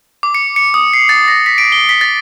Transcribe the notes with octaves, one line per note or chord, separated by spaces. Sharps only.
D6
C#7
C#7
D#6
C7
A6
A#6
B6
D7
G7
B6
A6